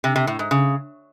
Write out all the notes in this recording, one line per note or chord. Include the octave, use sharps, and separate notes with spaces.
C3
C3
A2
G#2
C#3